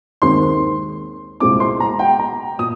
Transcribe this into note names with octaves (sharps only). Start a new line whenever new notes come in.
D#2 D#3 G#3 C4 C6
C2 A#2 G#3 C4 D6
C6
A#5
G5
A#5
A#2 D#6